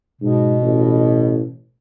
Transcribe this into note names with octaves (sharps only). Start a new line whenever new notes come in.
G#2 B2
A1